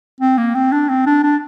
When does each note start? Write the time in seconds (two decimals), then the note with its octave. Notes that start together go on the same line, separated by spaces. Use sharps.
0.20 C4
0.37 A#3
0.54 C4
0.72 D4
0.88 C4
1.06 D4
1.23 D4